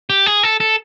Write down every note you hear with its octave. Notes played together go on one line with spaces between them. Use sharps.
G4
G#4
A4
A4